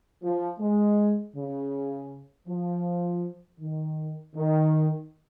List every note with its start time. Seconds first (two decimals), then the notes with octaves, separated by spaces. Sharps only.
0.23 F3
0.60 G#3
1.36 C#3
2.48 F3
3.60 D#3
4.36 D#3